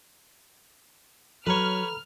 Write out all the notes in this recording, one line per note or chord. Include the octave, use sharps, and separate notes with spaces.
F#3 A4 B4 C#5 A#5 B5 F6